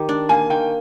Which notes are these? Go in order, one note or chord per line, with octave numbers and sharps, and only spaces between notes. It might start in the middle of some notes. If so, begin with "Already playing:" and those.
Already playing: D#3 G4
D4
A#3 G#5
D#3 G5